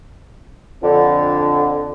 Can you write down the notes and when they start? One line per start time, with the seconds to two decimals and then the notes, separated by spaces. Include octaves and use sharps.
0.83 F2 D3